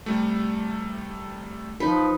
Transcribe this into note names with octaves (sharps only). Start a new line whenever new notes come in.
C3 G3 A3
F3 D#4 B4